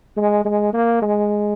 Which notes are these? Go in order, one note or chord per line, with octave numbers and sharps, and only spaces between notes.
G#3
G#3
A#3
G#3